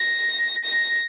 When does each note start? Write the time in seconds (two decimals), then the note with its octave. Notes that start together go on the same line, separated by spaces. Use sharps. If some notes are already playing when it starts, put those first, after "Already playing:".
Already playing: A#6
0.64 A#6